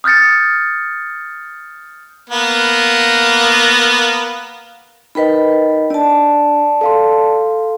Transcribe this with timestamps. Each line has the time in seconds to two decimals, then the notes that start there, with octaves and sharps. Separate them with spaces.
0.04 D#6 F6 G6 A6 C#7
2.30 A#3 B3
5.15 D#4 A#4 B4 D#5 G5 B5
5.90 D4 D5 A5
6.81 A4 F5 C6